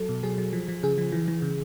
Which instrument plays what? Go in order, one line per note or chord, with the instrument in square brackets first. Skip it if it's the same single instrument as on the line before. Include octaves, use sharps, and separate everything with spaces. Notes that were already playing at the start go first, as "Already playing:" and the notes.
Already playing: [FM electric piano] F#3 A4
B2
F#3 G#4
F#3
F3
F3
C#3 G#4
F3
E3
E3
C#3